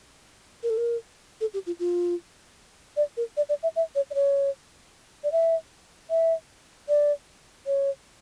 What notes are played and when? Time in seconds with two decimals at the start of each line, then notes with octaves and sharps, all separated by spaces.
0.63 A#4
0.70 A4
0.77 A#4
1.41 A4
1.54 G4
1.66 F4
1.80 F4
2.97 D5
3.17 A#4
3.37 D5
3.49 D5
3.63 E5
3.76 E5
3.95 C#5
4.10 D5
4.15 C#5
5.24 D5
5.32 E5
6.10 E5
6.89 D5
7.66 C#5